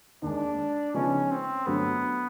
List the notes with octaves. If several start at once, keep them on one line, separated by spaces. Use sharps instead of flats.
D#2 D#3 G#3 D4
C#3 F3 G#3 B3 C#4 D#4
C4
G2 D3 F#3 A3 B3